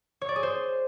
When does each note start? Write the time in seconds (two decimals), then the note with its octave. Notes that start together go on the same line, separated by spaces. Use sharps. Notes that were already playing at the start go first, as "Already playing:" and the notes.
0.21 C#5
0.29 D5
0.36 G#4
0.43 C5